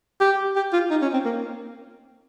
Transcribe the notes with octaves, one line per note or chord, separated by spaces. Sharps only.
G4
G4
F4
D#4
C#4
C4
A#3